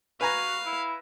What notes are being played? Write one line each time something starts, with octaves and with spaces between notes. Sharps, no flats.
F#4 B4 F5 G#5 A#5
E4